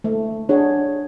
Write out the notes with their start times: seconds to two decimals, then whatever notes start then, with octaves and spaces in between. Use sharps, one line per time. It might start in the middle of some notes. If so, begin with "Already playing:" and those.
0.04 A3
0.49 D4 G#4 C#5 F#5